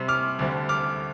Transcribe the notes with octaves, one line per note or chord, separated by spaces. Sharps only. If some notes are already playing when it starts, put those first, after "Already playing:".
Already playing: C3 G3 C4
D6 F6
D2 D3 G3 C4
D6 F6